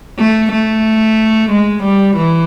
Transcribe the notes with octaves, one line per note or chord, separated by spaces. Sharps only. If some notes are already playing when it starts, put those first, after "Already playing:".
A3
A3
G#3
G3
E3